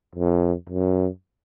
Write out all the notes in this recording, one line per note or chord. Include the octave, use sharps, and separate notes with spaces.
F2
F#2